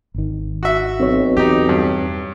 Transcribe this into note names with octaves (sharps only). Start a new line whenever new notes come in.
G#1 D#3
F#4 E5
B1 C4 C#5
E2 D#4 G4
G2